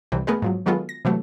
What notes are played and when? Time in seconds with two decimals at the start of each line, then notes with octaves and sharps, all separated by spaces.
0.12 C2 C3 E3 C4
0.27 A3 B3 G#4 A#4 B4
0.42 G#2 F3 F#3
0.66 D#3 F#3 G#3 B3 F4 A4
0.89 A#6
1.05 C3 E3 F#3 A3